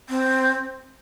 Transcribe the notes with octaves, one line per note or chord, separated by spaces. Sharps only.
C4